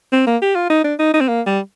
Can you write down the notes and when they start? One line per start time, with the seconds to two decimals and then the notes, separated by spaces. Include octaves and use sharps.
0.12 C4
0.27 A#3
0.42 G4
0.55 F4
0.70 D#4
0.84 D4
0.99 D#4
1.14 D#4
1.21 C4
1.28 A#3
1.46 G3